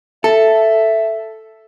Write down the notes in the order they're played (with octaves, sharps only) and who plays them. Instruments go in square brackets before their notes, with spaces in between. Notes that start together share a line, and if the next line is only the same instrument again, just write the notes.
[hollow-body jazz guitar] A4 [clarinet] E5